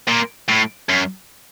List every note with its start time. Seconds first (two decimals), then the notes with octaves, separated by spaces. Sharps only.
0.08 A#2
0.49 A2
0.89 F#2